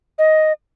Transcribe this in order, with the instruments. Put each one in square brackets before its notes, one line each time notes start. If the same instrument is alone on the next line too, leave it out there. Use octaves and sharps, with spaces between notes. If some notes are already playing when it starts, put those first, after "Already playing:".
[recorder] D#5